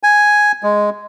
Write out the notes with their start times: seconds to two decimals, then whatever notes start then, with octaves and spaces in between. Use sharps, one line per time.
0.03 G#5
0.63 G#3